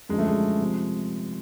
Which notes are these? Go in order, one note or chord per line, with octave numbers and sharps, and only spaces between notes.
F#2 D3 F3 G#3
A3
G#3
C3 F3